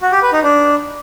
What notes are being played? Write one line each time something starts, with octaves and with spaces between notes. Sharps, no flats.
F#4
G4
B4
D#4
D4